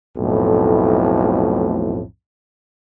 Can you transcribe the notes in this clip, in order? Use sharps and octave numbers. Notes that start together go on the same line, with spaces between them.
B1 F2 A2